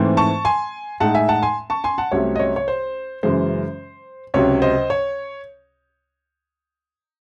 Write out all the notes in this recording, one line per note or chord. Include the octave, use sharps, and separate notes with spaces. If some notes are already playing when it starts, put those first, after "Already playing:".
Already playing: G#2 E3 A3 C4
A5 C#6
G#5 C6
A2 G#3 D#4 F#5 A5
E5 G#5
F#5 A5
G#5 C6
A5 C#6
G#5 C6
F#5 A5
C2 C3 F#3 A3 C#4 C#5
D#5
C#5
C#5
C5
F#2 C#3 E3 G#3 C5
C#2 C3 F#3 C#5
C5 D#5
C#5